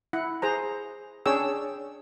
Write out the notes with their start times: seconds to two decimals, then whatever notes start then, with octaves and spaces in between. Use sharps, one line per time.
0.13 E4 F#5
0.42 G#4 C5 A#5
1.26 C#4 D4 G#4 C#5 G5 E6